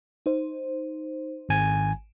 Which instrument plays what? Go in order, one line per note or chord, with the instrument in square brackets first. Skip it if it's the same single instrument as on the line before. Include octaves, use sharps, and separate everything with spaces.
[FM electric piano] D#4 C5
[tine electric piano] G#1 G#5